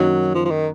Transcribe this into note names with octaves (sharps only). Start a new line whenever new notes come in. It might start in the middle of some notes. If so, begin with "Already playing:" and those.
Already playing: F#2 D#3 F#3 A#3 D#4 F#4
F3
F3
D#3